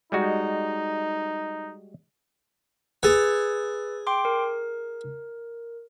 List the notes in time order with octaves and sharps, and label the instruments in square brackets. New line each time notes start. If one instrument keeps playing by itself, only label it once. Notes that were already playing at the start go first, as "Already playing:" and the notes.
[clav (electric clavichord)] G3 G#3 F#4 [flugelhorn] D#4
[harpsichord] G#4 G#5 [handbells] B4 E6 A6
[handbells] G5 C6 D6
A#4